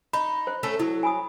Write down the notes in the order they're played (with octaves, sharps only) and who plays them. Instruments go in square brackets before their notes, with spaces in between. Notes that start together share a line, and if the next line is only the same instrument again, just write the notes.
[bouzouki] D#4 [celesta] B5
[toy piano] C5
[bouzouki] A3 C#4 A4
[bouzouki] F#3 [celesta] E4
[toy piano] G#5 B5 D#6